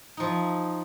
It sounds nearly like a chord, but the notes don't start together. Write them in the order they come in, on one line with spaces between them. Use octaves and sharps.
D#4 F3 E4